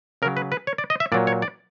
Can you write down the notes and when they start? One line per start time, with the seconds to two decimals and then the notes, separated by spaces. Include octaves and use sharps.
0.22 C#3 A#4
0.26 F#3
0.37 B4
0.52 B4
0.67 C#5
0.78 D5
0.90 D#5
1.00 E5
1.12 A#2 F#3 D5
1.27 C#5
1.42 D5